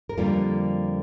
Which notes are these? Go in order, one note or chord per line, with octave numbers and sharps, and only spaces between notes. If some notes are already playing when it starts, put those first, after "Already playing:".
A#4
F2 D3 G3 A#3 F4 A4